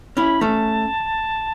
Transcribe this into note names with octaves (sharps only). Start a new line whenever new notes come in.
C#4 E4 B5
A3 C#4 A5